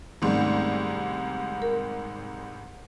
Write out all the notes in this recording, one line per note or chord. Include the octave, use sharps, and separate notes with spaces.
C2 G#2 D#3 G3 A3 C4 C#4
A#4